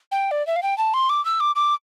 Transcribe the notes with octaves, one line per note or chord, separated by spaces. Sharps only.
G5
D5
E5
F5
G5
A5
C6
D6
E6
D6
D6